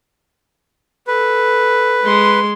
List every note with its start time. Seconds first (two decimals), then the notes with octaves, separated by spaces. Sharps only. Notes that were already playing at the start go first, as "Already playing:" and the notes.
1.07 A4 B4
2.03 G#3 C6